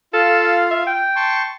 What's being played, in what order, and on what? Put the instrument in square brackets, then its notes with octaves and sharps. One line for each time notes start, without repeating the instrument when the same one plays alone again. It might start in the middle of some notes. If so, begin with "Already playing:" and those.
[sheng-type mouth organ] F4 F5 [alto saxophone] A4
[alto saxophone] E5
G5
[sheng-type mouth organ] A5 C6 C#6